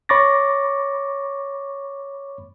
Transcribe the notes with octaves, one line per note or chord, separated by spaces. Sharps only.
C#5 B5 C#6 D6 A6 A#6